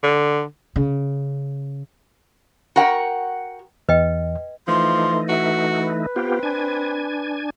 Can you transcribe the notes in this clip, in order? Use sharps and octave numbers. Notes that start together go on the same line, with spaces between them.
D3
C#3
F#4 A#4 F#5 G5
E2 B4 D#5 G5
E3 F3 A3 D#4 C6
F#4 E5
B4
B3 C4 F4 G4
D4 G#5